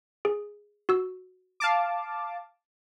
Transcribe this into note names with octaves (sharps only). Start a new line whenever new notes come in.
G#4
F#4 E6
F5 A5 D6